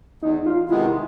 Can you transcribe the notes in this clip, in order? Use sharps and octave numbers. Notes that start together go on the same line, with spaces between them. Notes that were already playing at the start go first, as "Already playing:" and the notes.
E2 D#4
F4
C3 D#3 G#3 B3 E4